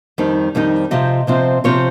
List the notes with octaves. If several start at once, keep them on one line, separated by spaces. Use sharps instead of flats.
F2 D#3 G3 C4 D#4
F2 D#3 G3 C4 D#4
C3 F3 C4 F4 D#5
C3 F3 C4 F4
C3 F3 C4 F4 C#5